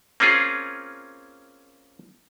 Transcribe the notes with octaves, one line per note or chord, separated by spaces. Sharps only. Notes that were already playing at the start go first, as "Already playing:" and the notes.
A#3 C4 C#4 F4 G#4